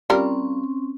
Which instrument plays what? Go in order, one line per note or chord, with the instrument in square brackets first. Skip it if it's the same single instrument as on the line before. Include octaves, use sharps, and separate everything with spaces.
[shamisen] G3 F4 A#4 [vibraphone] C4 C#4